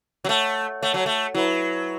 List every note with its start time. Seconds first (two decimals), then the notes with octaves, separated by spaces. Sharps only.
0.25 F#3
0.29 A3 C#5 F#5 A5
0.82 A3 C#5 F#5 A5
0.94 F#3
1.06 A3
1.34 F#3 E4 B4 E5 B5